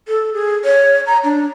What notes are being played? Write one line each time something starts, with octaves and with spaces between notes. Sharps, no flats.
A4
G#4
C#5
A#5
D4